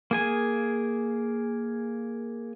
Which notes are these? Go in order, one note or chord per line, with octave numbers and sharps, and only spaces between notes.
A#3 G#4 G#5